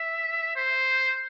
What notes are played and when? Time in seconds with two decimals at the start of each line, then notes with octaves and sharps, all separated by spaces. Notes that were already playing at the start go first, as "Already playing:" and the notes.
Already playing: E5
0.56 C5